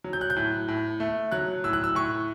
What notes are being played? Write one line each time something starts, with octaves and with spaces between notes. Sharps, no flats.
F#3
G6
F#6
G6
A2
A2
A3
F#3 F#6
A2 E6
F#6
E6
A2 C#6